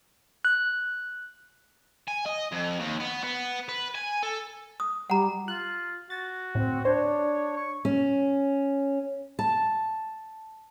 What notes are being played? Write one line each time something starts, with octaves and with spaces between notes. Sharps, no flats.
F#6
G#5
D#5
F2
D#2
B3
B3
B4
G#5
A4
D#6
G3 F#5 A#5
F4 F#6
F#4 A6
D2 A2 C4
D4 C5 C#5
C#6
C#4
A5